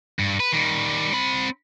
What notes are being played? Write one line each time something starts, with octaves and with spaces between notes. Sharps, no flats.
G2
B4
D#3 G3
C4 B5